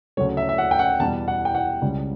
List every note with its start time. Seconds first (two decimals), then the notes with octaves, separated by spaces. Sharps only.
0.17 D2 C#3 F#3 A3 C#5
0.37 E5
0.49 E5
0.58 F#5
0.71 G5
0.79 F#5
0.99 E2 B2 G3 A5
1.28 F#5
1.45 G5
1.55 F#5
1.82 C#2 C#3 G3